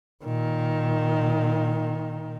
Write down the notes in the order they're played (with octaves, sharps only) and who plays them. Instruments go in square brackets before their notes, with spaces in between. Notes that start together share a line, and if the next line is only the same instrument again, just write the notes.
[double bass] A#2 D#3